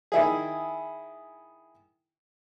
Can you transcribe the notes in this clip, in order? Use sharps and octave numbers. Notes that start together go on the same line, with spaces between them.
D#3 E4 G#4